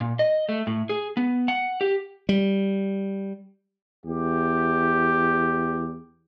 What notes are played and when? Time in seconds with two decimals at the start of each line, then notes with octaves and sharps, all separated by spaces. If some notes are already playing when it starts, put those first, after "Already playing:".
0.01 A#2
0.19 D#5
0.49 A3
0.67 A2
0.89 G#4
1.17 B3
1.48 F#5
1.81 G4
2.29 G3
4.06 E2 G4